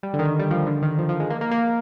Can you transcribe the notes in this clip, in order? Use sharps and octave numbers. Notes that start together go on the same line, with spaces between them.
G3
D3
D#3
G3
F3
D3
D#3
F3
F3
G#3
A#3
A#3
A#3